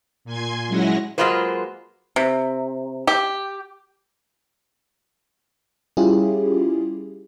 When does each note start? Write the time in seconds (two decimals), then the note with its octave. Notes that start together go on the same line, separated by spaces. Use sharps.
0.25 A#2 G#5 C6 G#6
0.68 F#3 G#3 C#4 E4 F#5 A#6
1.18 F#3 G#3 A#3 F4 B4 C5
2.16 C3
3.07 G4
5.97 G3 C#4 E4 F4 G4 G#4